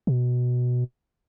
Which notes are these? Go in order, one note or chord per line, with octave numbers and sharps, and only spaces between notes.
B2